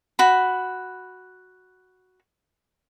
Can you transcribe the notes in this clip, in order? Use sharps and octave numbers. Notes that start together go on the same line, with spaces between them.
F#4 B5